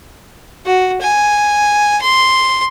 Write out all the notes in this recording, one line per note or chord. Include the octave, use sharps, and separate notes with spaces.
F#4
G#5
C6